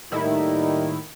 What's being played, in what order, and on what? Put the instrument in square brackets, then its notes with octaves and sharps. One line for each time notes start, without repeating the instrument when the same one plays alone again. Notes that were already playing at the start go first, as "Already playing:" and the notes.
[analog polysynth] A2 D#3 E4 [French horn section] G3 A#3 D#4